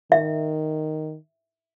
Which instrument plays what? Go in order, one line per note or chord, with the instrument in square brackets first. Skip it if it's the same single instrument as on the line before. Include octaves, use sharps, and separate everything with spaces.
[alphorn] D#3 [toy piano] E5